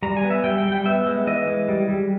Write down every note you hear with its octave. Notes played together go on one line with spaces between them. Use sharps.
G3 A#5
G#5
B3
E5
G3 G5
G5
G3
G5
B3 E5
G#3
E3 D#5
G#3
G3
G3